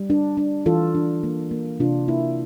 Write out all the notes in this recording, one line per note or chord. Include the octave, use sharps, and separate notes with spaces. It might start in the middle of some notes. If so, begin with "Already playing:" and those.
Already playing: G3
D4
D4
E3 F4 A4
D4
A#3
A#3
C3 D4 F4
A#3 E4